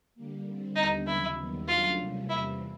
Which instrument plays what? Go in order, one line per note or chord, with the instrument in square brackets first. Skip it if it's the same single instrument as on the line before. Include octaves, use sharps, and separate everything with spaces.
[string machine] D3 G3 A#3
D3 G3 C4
[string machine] D#2 D3 G3 B3 D4 [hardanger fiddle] D#4
[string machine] D#2 C#3 F#3 [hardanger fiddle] E4
[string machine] D#2 D#3 G3 B3
[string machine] C#3 F#3 A3 D4 [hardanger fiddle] F4
[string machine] C3 E3 G3 A#3 C#4
[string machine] E2 C3 E3 G3 C4 [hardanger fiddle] E4